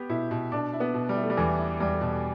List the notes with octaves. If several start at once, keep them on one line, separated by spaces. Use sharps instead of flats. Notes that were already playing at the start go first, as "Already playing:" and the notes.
Already playing: B3 G4
B2 E4
B2
B2 D4
E4
B3
B2
G3
E4
A3
G3
E2 E3
E4
E2 G3
B2